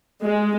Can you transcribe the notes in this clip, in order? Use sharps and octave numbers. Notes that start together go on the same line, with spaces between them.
G#3